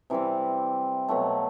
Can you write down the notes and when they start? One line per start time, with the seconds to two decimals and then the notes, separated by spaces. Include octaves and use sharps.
0.10 C3 E3 G3 C4
1.08 B2 F#3 A3